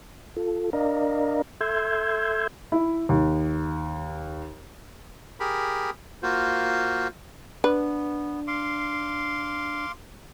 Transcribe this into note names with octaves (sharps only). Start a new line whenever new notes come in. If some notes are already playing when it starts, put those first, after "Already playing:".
F4 A4
D4 A#4 D5 D#5 F5 A#5
A4 E5 C6 E6 G6 G#6
E4
D#2
G4 G#4 A#4 B5
A#3 F4 F#4 C5
B3 D4 B4
F5 C6 D6